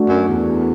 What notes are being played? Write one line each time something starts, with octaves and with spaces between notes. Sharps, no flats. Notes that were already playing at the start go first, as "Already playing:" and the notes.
Already playing: A3 D4 F#4
F#2
E2